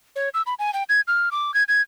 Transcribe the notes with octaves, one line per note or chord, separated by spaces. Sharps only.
C#5
E6
B5
G#5
G5
G#6
F6
D6
G#6
G#6